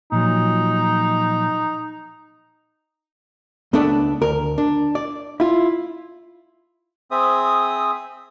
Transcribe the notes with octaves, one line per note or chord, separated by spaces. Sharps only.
A#2 F3 F#3 D#4
C#2 A3 B3 D4 A4 D5
D2 A#4
D4
D5
E4 F4
C4 G#4 C5 E5 D#6